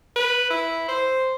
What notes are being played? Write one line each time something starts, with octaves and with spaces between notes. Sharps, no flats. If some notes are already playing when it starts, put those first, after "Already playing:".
B4
E4
C5